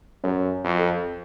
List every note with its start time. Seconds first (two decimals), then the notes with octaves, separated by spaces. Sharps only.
0.24 F#2 C#5
0.64 F2
0.78 A4